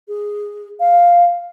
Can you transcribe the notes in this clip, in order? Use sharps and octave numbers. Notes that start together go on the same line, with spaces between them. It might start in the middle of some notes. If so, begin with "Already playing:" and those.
G#4
F5